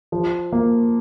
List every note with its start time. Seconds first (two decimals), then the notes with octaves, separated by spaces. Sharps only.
0.12 F3
0.52 A#3